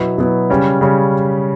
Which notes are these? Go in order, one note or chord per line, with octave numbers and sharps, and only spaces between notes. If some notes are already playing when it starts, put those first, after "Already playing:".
Already playing: B2 F#3 B3 E4
B2 F#3 B3 E4
C#3 G3 C#4
C#3 G3 C#4